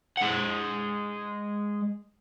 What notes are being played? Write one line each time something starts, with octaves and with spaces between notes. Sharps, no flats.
G#3 F#5